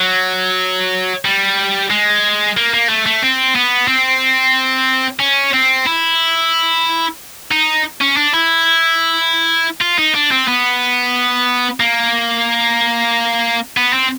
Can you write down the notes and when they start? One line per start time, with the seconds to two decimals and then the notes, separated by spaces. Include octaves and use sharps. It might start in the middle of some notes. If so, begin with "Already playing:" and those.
Already playing: F#3
1.25 G3
1.90 G#3
2.57 A#3
2.74 A#3
2.89 A3
3.06 A3
3.22 C4
3.55 B3
3.88 C4
5.20 C#4
5.53 C4
5.87 E4
7.51 D#4
8.01 C#4
8.17 D4
8.34 E4
9.81 F4
9.98 D#4
10.15 D4
10.31 C4
10.48 B3
11.80 A#3
13.77 B3
13.93 C4